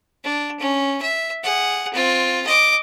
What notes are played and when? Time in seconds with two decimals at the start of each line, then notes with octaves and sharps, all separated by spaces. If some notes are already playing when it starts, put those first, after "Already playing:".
0.24 D4
0.60 C#4
1.02 E5
1.43 G#4 F#5
1.94 C4 F4
2.47 D#5 D6